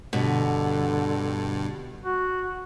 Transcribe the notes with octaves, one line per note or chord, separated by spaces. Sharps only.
G2 B2 D3
F#4